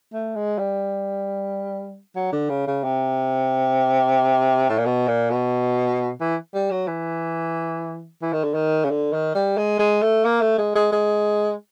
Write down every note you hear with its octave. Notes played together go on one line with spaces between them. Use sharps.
A3
G#3
G3
F#3
D3
C#3
C#3
C3
A2
A#2
B2
A#2
B2
E3
G3
F#3
E3
E3
D#3
D3
D#3
C#3
D3
D#3
G3
G#3
G#3
A3
A#3
A3
G#3
G#3
G#3